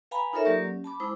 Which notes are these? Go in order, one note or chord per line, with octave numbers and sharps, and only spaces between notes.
B4 F5 G5 G#5 A#5 B5
D#4 F4 A4 A#4 C#5 E5
F#3 A#3 G4 D5 C#6
C#4
A5 B5 D6
G#3 E4 C5 D6 D#6